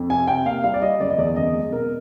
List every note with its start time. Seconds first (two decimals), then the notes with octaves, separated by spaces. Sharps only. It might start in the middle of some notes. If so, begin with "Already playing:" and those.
Already playing: F2
0.10 C3 G#5
0.28 C3 G5
0.46 A#3 F5
0.63 G3 F5
0.74 D5
0.82 G3 D#5
1.00 F#1 D5
1.10 D#5
1.18 E2 D5
1.36 F#1 D#5
1.54 G#3
1.72 B2 A#4